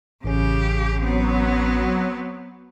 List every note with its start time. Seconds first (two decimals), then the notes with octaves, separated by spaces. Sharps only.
0.24 A1 C#3 C#4 G4
1.04 F#3 B3 C4